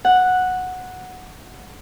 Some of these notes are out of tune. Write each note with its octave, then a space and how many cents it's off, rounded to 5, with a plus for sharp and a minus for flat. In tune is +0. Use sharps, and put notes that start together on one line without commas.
F#5 -5